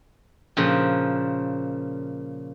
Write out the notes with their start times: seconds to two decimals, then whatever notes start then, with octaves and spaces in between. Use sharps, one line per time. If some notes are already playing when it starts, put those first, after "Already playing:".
0.57 A#2 C#3 F3